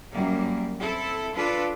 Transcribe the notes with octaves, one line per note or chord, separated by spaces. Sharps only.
F#2 G3 A#3
C4 E4 A4
D4 F4 A4 B4